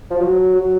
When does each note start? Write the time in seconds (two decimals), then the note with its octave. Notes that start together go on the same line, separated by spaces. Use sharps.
0.11 F3
0.19 F#3
0.55 F#3